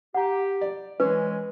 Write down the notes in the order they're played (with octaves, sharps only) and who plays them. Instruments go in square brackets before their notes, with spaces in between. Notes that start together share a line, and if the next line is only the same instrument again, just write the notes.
[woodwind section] G4 [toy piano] F#5 A#5
[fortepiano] D5
[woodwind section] E3 G#3 [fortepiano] C#4 [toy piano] B4